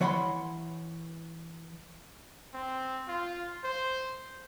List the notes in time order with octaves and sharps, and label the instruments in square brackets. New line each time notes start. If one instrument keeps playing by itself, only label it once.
[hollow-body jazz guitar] E3 C#5 F#5 B5 C6
[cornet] C4
F4
C5